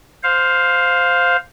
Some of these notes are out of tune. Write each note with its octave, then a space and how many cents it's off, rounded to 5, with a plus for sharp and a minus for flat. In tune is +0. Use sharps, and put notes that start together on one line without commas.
C5 -5 F5 +10